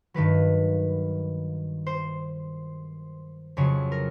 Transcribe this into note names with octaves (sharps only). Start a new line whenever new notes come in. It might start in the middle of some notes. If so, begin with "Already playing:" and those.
G2 D#3 F#3 B4
C5
F2 C#3 F#3 C#5
A#4